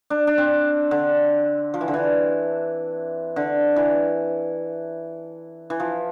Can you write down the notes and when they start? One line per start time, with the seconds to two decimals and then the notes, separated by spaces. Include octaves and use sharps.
0.10 D4
0.27 D4
0.38 C4
0.91 D3
1.74 F3
1.81 E3
1.88 D3
1.94 E3
3.36 D3
3.76 E3
5.70 E3
5.80 F3